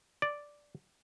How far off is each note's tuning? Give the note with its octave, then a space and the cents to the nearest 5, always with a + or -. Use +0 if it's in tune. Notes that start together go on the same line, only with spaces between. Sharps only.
D5 +0